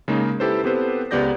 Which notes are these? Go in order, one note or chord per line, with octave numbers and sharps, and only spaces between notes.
C#3 G#3 A#3 D#4 G#4
E4 G4 A4 B4 C5
B3 C4 G4 A4 B4 C5
C#2 B3 G4 D5 G6 A#6